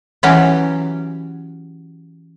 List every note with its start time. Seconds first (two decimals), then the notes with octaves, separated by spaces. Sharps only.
0.23 E3 F#3 C#4 F#4 G4